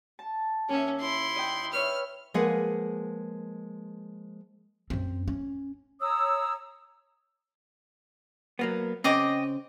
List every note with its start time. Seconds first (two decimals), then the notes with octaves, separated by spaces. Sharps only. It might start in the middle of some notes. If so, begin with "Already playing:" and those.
0.19 A5
0.69 D#2 C#4 E5
1.00 E4 C6
1.36 D#5 G5
1.73 B4 C#5 E5 F6
2.34 F3 G#3 A#3 G#4 B4 F#5
4.90 F#2 C4
5.28 C#4
6.01 C#5 A#5 D#6 E6
8.59 F#3 A#3 B3
9.04 C#3 C4 D#5 G5 D6